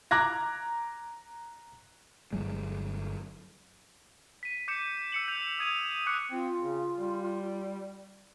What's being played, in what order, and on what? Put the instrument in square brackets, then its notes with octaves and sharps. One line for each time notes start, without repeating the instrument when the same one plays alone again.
[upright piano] A#5 D6 F#6 G#6 A#6
[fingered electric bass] G1 F#3 G#3
[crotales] B6 D#7
D6 G6 B6 C#7 E7
E6 C#7 F#7
G6 F7
D#6 G#6 D#7 F7
C#6 D6 F#6 C#7 D#7
[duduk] C4 [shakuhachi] F4
[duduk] C#3
G3